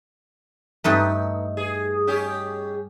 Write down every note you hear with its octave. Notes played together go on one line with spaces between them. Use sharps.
G2 A3 D#4 B4
G#4
C#4 G4 G#4